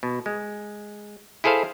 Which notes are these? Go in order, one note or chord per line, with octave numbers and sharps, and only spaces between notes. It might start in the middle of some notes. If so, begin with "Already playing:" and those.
B2
G#3
E4 G#4 A4 C5 F5